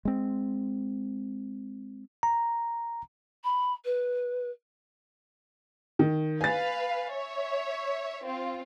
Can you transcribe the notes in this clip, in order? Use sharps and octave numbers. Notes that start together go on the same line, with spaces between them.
G#3 C4
A#5
B5
B4
D#3
B4 F5 G#5 A6
C#5 E5
C4 F4